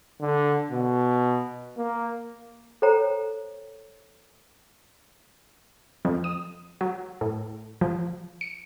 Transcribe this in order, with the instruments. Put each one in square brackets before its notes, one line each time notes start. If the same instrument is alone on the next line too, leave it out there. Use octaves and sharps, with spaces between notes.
[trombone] D3
B2
A#3
[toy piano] A4 C5 C#5 G5 A#5
[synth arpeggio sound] F2
D#6
F#3
A2
F3
C#7